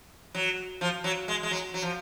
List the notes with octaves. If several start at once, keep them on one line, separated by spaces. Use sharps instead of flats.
F#3
F3
F#3
G#3
G#3
F#3
F#3
F3